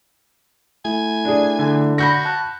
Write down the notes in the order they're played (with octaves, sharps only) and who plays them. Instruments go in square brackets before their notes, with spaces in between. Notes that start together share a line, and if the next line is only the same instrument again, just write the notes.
[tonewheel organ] A3 E4 [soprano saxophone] G#5
[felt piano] D4 G#4
[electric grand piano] D3
[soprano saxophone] F#4 [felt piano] B5 G6 A#6
[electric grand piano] A5 F#6